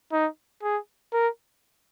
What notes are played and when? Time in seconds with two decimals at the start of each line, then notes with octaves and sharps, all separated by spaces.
0.12 D#4
0.63 G#4
1.13 A#4